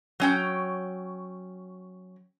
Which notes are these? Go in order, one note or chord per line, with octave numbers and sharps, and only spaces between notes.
F#3 C#4 G5